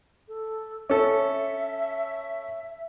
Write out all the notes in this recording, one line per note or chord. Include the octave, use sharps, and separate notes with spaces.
A4
C#4 A4 E5